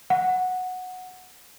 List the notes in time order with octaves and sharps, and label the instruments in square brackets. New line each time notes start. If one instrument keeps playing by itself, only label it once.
[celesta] F#5